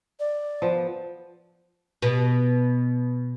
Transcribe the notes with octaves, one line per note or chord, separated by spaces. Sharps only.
D5
F3 B3
B2